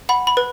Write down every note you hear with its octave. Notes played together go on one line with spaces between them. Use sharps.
F#5 B5
B5
B4